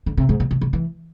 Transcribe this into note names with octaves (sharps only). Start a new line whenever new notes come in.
D3
C3
G#2
B2
C3
C3
E3